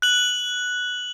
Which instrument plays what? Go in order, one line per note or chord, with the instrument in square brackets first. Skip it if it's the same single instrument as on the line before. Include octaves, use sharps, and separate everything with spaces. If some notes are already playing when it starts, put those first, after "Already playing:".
[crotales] F#6 F#7